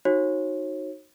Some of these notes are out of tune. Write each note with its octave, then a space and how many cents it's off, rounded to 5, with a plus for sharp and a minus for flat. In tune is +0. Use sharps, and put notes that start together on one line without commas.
D#4 +0 F#4 +0 C#5 -35